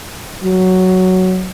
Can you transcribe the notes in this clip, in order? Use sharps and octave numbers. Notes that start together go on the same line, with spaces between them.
F#3